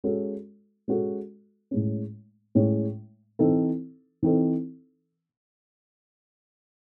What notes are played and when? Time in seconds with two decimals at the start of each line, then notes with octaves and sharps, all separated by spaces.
0.04 G#3 C#4 F#4 A4
0.88 G#3 C#4 F#4 A4
1.71 A2 G#3 C#4
2.55 A2 G#3 C#4
3.39 E3 C4 D#4 A4
4.23 E3 C4 D#4 A4